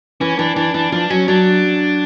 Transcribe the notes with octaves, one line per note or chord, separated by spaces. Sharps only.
E3 C#4
E3 D4
E3 D4
E3 D4
F3 D4
F#3 C#4
F#3 D4